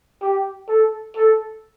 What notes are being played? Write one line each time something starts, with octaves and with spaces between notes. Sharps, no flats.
G4
A4
A4